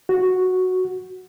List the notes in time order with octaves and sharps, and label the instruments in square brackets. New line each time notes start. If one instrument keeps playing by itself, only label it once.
[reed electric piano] F#4